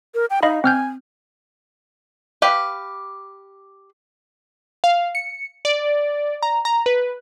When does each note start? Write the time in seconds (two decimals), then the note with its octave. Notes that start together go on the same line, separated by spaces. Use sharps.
0.15 A#4
0.30 G5
0.43 D#4 D#5 F5 B5
0.64 C4 G#5 F6 G6
2.42 G4 B4 F5 G5
4.84 F5
5.15 C#7
5.65 D5
6.43 A#5
6.65 A#5
6.86 B4